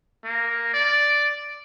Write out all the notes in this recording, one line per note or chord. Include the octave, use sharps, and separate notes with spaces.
A#3
D5